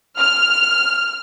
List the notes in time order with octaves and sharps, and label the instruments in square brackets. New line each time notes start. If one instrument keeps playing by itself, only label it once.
[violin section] F6